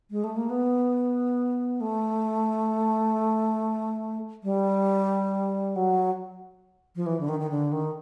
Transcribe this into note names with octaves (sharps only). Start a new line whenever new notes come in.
G#3
A3
A#3
B3
A3
G3
F#3
F3
E3
D3
D#3
D#3
D3
D#3